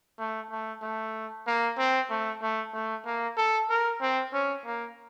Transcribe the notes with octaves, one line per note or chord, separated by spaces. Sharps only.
A3
A3
A3
A#3
C4
A3
A3
A3
A#3
A4
A#4
C4
C#4
A#3